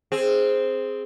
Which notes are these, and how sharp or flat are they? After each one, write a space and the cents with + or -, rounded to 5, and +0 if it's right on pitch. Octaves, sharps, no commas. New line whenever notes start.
C4 +0 G#4 +0